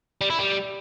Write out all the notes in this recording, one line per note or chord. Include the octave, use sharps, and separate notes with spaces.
G3
E4
G3